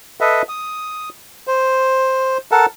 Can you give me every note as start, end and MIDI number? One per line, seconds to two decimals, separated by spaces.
0.21 0.42 69
0.21 0.42 71
0.21 0.42 75
0.21 0.42 76
0.49 1.09 87
1.47 2.38 72
2.52 2.66 69
2.52 2.66 70
2.52 2.66 78
2.52 2.66 81